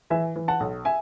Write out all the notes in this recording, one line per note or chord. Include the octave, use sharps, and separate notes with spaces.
E3 E5 G#5
E3
F#5 A5
B1
E5 G#5